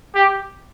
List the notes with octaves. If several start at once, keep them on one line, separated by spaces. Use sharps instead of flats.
G4